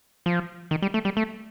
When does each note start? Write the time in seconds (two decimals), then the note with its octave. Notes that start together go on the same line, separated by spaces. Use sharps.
0.26 F3
0.71 D#3
0.82 G3
0.94 A3
1.05 G3
1.17 A3